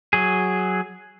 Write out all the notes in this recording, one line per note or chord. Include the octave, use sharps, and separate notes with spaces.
F#3 G#4